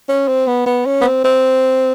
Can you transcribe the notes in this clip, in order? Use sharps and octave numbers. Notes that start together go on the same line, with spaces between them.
C#4
C4
B3
B3
C#4
B3
C4
C4